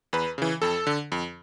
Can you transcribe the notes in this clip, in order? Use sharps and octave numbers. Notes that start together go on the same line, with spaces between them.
E2 B4
C#3 E3
F2 A4
D3
F2